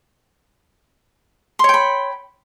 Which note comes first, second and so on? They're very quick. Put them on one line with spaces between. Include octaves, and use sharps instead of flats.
C6 C#5 G5 B5